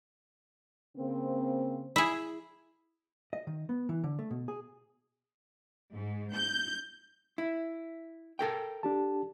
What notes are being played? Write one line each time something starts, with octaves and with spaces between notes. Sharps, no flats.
C#3 A#3 C4
E4 G#4
D#5
D#3
B3
E3
D3
A3
B2
G#4
G#2
G6
E4
A4 A#4 G5
D4 G4 A5